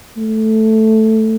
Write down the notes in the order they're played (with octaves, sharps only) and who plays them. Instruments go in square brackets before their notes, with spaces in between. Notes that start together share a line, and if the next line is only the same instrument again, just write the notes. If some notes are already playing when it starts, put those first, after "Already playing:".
[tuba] A3